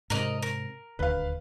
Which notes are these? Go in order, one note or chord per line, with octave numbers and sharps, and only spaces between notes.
G#2 C3 A#4 D5 D#5
A#4
D#1 D2 B4 F5